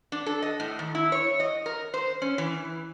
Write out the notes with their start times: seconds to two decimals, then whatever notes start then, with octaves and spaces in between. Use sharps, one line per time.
0.12 D4
0.26 A4
0.42 D#5
0.60 A2
0.79 D#3
0.95 E4
1.12 C#5
1.40 D#5
1.66 A#4
1.94 C5
2.22 C#4
2.38 E3